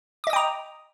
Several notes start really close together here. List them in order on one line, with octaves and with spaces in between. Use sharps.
D6 D#5 D#6 G5 A#5